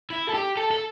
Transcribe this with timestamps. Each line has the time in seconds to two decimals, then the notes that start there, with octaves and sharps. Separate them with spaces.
0.10 E4
0.29 A4
0.34 G4
0.57 A4
0.71 A4